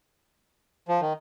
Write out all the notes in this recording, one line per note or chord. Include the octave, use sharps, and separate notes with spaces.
F3
D#3